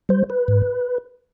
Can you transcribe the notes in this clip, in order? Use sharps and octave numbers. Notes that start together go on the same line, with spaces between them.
G3 C5
B4
G#2